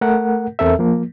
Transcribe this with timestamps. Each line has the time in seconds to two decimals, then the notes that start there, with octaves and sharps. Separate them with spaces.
0.01 A3 A#4 F#5
0.59 E2 C4 A4 A#4 E5
0.79 F3 A#3